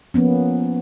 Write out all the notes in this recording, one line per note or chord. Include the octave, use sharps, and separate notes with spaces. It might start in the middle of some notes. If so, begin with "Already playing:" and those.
F3 A#3 B3 C#4